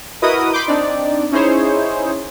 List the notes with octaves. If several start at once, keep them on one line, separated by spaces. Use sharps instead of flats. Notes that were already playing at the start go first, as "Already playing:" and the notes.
E4 F#4 A#4 B4 D#5 D#6
B5 C6 D6 G6
C4 D4 D#4 D5
C#4 D#4 E4 G#4 C5 C#5